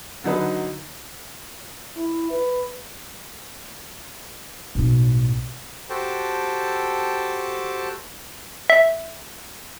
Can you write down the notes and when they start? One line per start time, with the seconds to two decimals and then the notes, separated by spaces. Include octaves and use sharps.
0.24 D3 F#3 D#4 B4
1.96 E4
2.31 B4
4.75 B1 A2
5.90 F#4 G4 A4 C5 G5 A5
8.70 E5